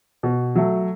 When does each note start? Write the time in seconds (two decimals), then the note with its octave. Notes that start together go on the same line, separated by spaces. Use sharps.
0.23 B2
0.55 F#3 A3